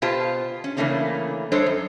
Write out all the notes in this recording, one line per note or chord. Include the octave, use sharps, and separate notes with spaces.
B2 F4 G4 C5 A5
C#4
C#3 E3 A3 A#3 C#4 D4
G3 D4 A4 C5 C#5 D#5
F#2